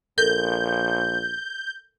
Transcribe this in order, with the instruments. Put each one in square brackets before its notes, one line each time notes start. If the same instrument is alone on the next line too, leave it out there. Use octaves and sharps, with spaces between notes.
[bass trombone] A#1 [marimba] A4 A#4 [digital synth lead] G6